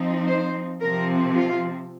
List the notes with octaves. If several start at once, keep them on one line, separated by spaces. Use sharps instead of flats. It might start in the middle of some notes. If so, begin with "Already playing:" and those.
Already playing: F3 C4 D#4
C5
C3 F3 C4 A#4
F4